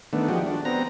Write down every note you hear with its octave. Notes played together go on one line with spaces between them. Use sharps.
D#3 A3 B3 D4
F3 G#3 F#4 G4
D4
B3 C4 A#5